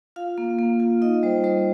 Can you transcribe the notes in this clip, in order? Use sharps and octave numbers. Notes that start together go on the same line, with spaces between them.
F4 F5
A#3
A#3
F4
D#4 D#5
G3 C5
G3 C5